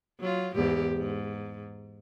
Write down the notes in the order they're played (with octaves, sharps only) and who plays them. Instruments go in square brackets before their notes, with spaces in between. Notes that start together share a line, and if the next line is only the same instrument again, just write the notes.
[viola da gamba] F#3 F4
E2 G#2 G4
G#2